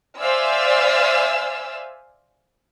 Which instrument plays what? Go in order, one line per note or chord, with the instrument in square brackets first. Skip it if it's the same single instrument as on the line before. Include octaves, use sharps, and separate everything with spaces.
[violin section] C5 D5 E5 F5 G#5 E6